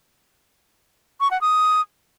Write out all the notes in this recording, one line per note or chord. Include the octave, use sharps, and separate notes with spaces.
C#6
F#5
D#6